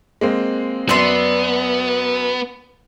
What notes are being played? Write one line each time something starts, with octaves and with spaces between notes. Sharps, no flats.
G#3 A#3 C4
F#2 B3 D5 E5 C6